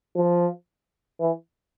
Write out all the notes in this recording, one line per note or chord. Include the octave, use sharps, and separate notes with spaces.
F3
E3